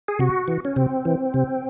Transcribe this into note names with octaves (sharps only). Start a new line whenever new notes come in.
G#4
C3 F#4
E3
C#4
C3 C4
E3
C3